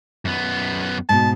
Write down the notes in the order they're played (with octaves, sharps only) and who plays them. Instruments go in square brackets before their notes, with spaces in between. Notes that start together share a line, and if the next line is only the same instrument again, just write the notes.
[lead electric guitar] F#2 B3
[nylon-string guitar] G#2 B2 [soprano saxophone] A5